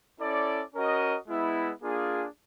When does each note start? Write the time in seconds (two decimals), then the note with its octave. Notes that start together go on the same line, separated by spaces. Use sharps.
0.20 C#4 E4 A4 D5
0.74 C#4 F#4 A#4 D#5
1.28 G#3 B3 E4
1.82 A#3 D4 F4 G#4